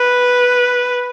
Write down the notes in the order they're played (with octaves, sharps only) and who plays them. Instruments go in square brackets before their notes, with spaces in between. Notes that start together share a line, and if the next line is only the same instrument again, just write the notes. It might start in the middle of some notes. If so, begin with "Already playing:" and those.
Already playing: [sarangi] B4